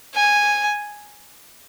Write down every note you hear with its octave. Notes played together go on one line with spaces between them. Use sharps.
G#5